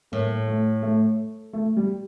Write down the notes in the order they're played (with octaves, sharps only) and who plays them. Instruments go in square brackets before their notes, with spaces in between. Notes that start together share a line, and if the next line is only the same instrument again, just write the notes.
[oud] A2 [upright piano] A#3
[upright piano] A3
A3
A3
G3